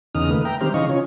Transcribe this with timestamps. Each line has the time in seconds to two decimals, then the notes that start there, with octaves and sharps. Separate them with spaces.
0.15 E2 C#3 D#4 D#6 F6
0.30 D#3 A3 A#3 B4
0.45 E5 G5 A#5
0.61 D#3 G3 C4 G4 C5 F6
0.74 C#3 E3 D#4 D#5 F5 C#6
0.89 C#4 F4 C#5